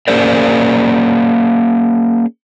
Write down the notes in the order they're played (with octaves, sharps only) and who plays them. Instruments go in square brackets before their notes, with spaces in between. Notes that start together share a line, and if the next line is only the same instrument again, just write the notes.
[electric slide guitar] A#3 C#4 G#4 A#4 C5 D5